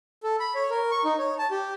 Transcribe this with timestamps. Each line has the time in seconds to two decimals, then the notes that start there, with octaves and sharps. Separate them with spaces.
0.23 A4
0.40 B5
0.55 C#5
0.70 A#4
0.91 C#6
1.05 D#4
1.19 C#5
1.39 A5
1.51 G4